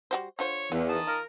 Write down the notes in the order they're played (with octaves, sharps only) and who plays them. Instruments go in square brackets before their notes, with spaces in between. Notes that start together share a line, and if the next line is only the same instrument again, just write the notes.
[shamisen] G3 F#4 C5
[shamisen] D3 F4 C5 [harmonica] C#5
[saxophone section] E2 [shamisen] E3 F4
[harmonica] D#3 A5 D#6
[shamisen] F4 [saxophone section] A#4